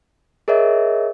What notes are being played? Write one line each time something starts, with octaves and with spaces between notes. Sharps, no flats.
G#4 A#4 C#5 D#5 E5